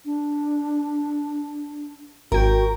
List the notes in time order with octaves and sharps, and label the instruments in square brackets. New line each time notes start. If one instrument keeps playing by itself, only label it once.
[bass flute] D4
[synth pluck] G#1 G5 [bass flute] F#4 [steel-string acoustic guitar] A#4